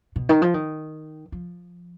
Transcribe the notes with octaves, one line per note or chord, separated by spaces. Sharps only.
B2
D#3
F3
D#3
F3